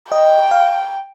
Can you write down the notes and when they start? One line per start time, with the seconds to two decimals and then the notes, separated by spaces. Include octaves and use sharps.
0.12 D#5 G5
0.51 F5